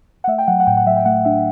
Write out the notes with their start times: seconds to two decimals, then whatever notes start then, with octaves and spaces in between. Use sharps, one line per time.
0.24 F#5
0.27 A3 E5
0.39 G5
0.48 F#3 F#5
0.60 F#5
0.67 A2 G5
0.77 F#5
0.86 F#3 E5
0.97 G5
1.05 A3 F#5
1.25 D4 E5